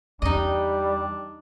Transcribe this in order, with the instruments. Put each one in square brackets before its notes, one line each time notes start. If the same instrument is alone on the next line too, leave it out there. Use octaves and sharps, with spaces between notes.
[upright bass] E2 [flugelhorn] G3 [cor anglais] D4 [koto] D#4 D#5